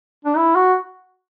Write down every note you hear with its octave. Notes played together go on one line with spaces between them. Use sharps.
D4
E4
F#4